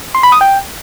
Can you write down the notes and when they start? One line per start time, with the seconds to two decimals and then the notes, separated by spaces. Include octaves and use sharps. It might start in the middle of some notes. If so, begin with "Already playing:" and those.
0.15 C6
0.23 B5
0.32 D#6
0.41 G5